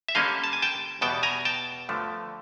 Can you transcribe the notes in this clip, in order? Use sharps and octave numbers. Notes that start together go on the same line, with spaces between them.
E5
D3 G3 A#3 C#4 D#5 F5
A5
G#5
G5 A5
E2 B2 G3 B3 G5 A5
G#5 A#5
G5 A5
G2 D3 F3 A3